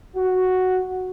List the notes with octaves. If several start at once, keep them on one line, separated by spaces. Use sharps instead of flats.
F#4